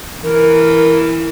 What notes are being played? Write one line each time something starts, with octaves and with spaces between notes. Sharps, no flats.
E3 A#4